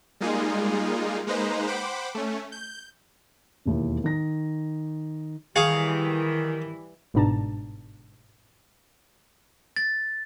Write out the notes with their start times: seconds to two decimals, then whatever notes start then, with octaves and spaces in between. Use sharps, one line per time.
0.21 G3 G#3 A#3 D#4 F4 G#4
1.27 G#3 A#3 D#4 B4 C5 A#5
1.67 C5 F#5 G5 B5 D6
2.15 A3 C#4
2.52 G6
3.66 E1 D#2 E4
4.04 D#3 A#6
5.56 D#3 E3 G3 G#4 F5 C#6
7.14 G1 G#2 B2 D4 A5 A#5
9.76 A6